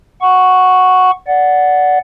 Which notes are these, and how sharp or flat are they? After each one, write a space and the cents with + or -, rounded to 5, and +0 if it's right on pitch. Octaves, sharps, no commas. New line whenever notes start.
F#5 -5 C#6 +0
D5 -15 F#5 +0